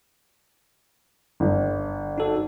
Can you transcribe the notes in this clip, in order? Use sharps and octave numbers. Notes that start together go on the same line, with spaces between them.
G1
D#4 F#4 A4